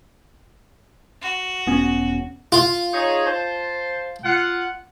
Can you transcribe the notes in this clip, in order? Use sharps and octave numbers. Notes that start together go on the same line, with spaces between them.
F#4
E1 B3 C#4
F4
D#4 G#4 C#5
C5 A5
F4 F#5